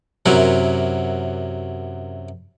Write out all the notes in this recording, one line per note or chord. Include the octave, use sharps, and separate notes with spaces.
F#2 C3 F#3 E4 A#4 F#5